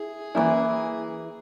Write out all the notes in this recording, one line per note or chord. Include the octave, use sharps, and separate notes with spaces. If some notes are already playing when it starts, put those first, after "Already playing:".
Already playing: E4 G#4
E3 G3 A#3 E4